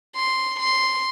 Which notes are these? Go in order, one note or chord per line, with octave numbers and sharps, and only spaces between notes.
C6
C6